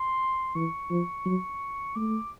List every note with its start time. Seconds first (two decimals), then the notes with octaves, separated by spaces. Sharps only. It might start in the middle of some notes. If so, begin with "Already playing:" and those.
Already playing: C6
0.55 E3 C#6
0.90 F3
1.26 F#3
1.95 A3 D6